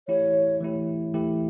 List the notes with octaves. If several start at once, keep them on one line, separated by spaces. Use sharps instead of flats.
E3 A3 E4 G4 C#5
E3 A3 E4 G4
E3 A3 E4 G4